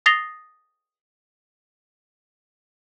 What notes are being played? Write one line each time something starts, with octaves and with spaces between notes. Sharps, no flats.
D#6 A6 A#6 C7 F7 G7